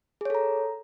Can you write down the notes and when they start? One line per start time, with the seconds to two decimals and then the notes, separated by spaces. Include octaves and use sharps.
0.21 G#4
0.25 C#5
0.30 A4
0.35 A#5